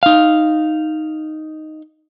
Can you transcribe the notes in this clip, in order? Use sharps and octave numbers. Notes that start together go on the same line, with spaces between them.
D#4 F5